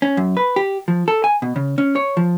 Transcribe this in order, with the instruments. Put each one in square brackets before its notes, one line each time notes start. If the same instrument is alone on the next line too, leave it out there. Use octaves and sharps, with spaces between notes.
[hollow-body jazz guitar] C#4
F#2
B4
G4
F3
A4
G#5
B2
C#3
C#4
C#5
F3